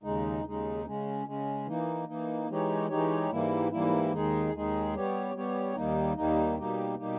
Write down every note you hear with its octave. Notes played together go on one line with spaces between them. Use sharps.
D#2 C#3 G#3 D#4
D#2 C#3 G#3 D#4
C#3 G#3 C#4
C#3 G#3 C#4
E3 A#3 D#4
E3 A#3 D#4
E3 G#3 D#4 G4 C#5
E3 G#3 D#4 G4 C#5
G#2 E3 G3 A#3 E4
G#2 E3 G3 A#3 E4
D#2 D#3 G#3 D#4 G#4
D#2 D#3 G#3 D#4 G#4
G3 B3 G4 C#5
G3 B3 G4 C#5
D#2 D#3 G3 A#3 D#4
D#2 D#3 G3 A#3 D#4
B2 G3 A#3 D#4 G4
B2 G3 A#3 D#4 G4